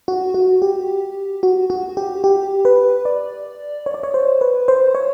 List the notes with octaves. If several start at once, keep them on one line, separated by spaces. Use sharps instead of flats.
F#4
F#4
G4
F#4
F#4
G4
G4
B4
D5
C#5
D5
C#5
C5
B4
C5
C#5